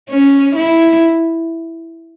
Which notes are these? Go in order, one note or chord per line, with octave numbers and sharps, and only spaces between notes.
C#4
E4